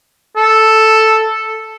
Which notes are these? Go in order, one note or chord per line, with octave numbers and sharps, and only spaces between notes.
A4